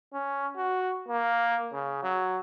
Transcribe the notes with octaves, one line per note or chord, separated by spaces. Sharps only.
C#4
F#4
A#3
C#3
F#3